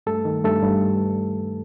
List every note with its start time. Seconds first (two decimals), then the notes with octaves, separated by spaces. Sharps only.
0.07 G2 A3 A4
0.25 D#3
0.44 G2 A3 A4
0.63 G2